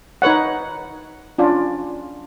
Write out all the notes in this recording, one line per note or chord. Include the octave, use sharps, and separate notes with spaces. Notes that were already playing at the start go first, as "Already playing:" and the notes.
D#4 B4 C#5 F#5
C#4 D4 F4 D5